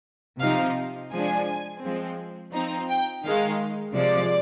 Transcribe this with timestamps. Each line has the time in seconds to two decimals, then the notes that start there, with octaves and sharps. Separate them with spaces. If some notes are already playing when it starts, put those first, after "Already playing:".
0.41 C3 F3 C4 D#4 F5
1.13 F3 G#3 D4 G#5
1.83 F3 G#3 C4
2.53 F3 C4 D#4 A#5
2.89 G5
3.24 D#3 G#3 D#4 F5
3.95 C3 F3 G#3 D5